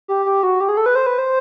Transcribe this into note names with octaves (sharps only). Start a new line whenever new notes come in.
G4
G4
F#4
G4
G#4
A4
B4
C5
B4
C5